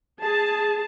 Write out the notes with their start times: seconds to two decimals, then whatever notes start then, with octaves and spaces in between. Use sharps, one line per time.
0.21 G#4 A5